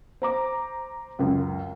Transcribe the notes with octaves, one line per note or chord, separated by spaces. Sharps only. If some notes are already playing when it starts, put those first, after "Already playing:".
C5 A#5 D6
C#2 F#2